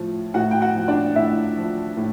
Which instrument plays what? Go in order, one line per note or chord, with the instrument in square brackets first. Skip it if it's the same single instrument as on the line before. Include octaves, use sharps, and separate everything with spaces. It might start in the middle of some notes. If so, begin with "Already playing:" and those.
Already playing: [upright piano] A2 F3
A2 F#4 F#5
G5
F#4 F#5
F3
D4 D5
A2 E4 E5
F3
A2